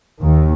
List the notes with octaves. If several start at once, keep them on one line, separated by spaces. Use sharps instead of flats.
D#2 D#3